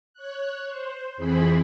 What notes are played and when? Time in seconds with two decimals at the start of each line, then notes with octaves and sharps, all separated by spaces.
0.14 C#5 F#6
0.69 C5
1.17 F2 E3 C4 G#4 C5 B5